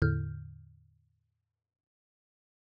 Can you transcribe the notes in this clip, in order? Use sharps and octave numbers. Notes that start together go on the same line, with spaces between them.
E2 A2 D3 F6 G6